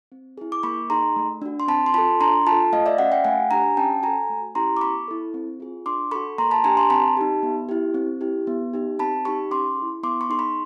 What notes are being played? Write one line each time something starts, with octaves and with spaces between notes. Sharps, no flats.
C4
E4 G#4
D6
A#3 B5 C#6
D#4 G#4 A#5 C6
A3
D4 F#4
C6
C4 A5 B5
C6
F4 A4 A5 B5
D4 A#5 C6
F4 A5 B5
A4
A3 D#5 F5
D5 E5
C#4 F#4 E5 F#5
F5 G5
A3 F#5 G#5
D4 G4 G#5 A#5
C#4 G5 A5
F#4 A4 G#5 A#5
A3
C#4 E4 G4 A#5 C6
D6
B3 B5 C#6
E4 A4
C4
F4 G#4
D4 C6 D6
F#4 A4 B5 C#6
A#3 A#5 C6
A5 B5
D4 G4 G#5 A#5
A#5 C6
C4 A5 B5
D#4 G4
B3
E4 G4
C4
E4 G4
B3
D#4 G4
C4 A5 B5
D#4 G4 B5 C#6
C#4 C6 D6
E4 G#4
B3 C6 D6
B5 C#6
D#4 G#4 C6
B5 C#6